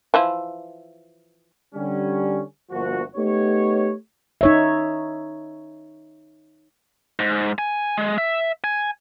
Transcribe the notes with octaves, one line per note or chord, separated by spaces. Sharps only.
E3 F3 E4
D3 G3 C#4
G1 D2 F3 A#3 F#4
A3 B3 D#4 G4 C#5
D#4 C#5 E5
G#2
G#5
G#3
E5
G#5